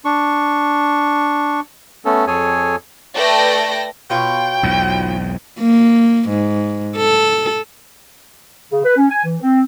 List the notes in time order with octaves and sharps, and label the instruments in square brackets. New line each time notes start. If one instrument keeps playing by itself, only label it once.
[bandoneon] D4 C#6
A3 B3 C#4 A4
F2 G#4 A4 C#5 G#5
[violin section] A3 A4 B4 D5 G5 A#6
[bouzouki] B2 F4 C#5 [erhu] G5
[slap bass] B1 E2 G#2
[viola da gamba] A#3
G#2
A4
[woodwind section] C#3
B4
C#4
G#5
E3
C4